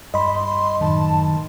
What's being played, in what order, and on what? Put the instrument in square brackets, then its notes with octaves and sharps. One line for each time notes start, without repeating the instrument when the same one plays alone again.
[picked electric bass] G2 [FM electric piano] D#5 B5 [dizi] C6
[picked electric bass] F#2 A2 [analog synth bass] D#3 [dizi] A5